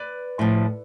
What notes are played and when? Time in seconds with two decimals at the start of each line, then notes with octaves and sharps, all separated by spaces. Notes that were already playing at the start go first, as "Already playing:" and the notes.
Already playing: B4 D5
0.39 A2 F3